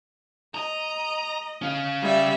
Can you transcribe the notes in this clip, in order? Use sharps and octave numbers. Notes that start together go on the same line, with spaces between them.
D#5 A#5
C#4 F5
G3 E5